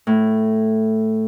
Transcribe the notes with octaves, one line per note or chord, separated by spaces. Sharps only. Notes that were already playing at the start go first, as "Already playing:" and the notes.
A2